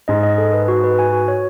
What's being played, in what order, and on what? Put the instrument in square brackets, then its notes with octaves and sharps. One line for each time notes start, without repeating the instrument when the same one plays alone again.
[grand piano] G#2 [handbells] D#5
[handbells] D#5
A4
B4
F#4
B4
G#5
F#4
C#5